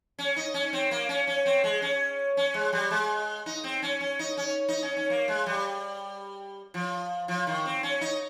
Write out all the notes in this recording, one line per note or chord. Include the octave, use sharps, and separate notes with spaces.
C#4
D#4
C#4
C4
A#3
C#4
C#4
C4
G#3
C#4
C#4
G#3
G3
G#3
D#4
C4
C#4
C#4
D#4
C#4
D#4
C#4
C#4
A#3
G#3
G3
F3
F3
D#3
C4
C#4
D#4